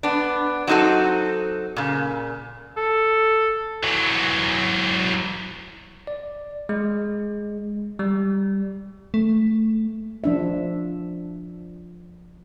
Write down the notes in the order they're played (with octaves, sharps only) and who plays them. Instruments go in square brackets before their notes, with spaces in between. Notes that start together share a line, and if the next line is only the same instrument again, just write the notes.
[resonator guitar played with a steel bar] B3 D4
F#3 C4 D#4 F#4 A4
A#2 C#3
[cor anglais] A4
[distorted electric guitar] E3 F#3
[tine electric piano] D5
G#3
G3
[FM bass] A3
[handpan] F3 D4 E5